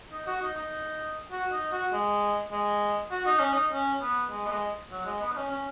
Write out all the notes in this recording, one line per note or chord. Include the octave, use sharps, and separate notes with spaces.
D#4
F#4
D#4
D#4
F#4
D#4
F#4
G#3
G#3
F#4
D#4
C#4
D#4
C#4
B3
G#3
B3
G#3
F#3
G#3
B3
D#4
C#4
C#4